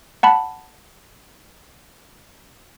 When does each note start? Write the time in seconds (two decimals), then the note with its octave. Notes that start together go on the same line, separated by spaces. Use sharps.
0.23 F#5 A5 B5